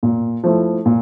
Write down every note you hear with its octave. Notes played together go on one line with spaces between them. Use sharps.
A#2
F3 A3 E4
A#2